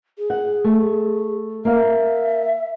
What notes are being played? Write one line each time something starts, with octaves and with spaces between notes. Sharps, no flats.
G#4
F#5
A3
A#3 E5 F5